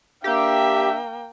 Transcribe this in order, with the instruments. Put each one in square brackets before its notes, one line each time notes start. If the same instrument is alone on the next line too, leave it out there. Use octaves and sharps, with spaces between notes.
[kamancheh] A#3 G5 [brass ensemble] D4 E5 [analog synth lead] G4